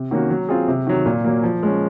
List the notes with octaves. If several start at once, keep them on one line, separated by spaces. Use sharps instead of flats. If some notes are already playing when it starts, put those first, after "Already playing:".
Already playing: C3
D#3 A#3 C#4 F#4
F#3
C4 F4 G#4
C3
D#3 F#3
A#2
F#3 A#3
F3
G#3 C#4